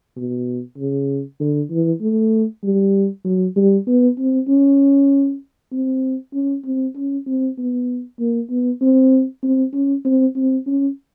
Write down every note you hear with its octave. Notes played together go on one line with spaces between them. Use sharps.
B2
C#3
D3
E3
A3
G3
F#3
G3
B3
C4
C#4
C4
C#4
C4
C#4
C4
B3
A#3
B3
C4
C4
C#4
C4
C4
C#4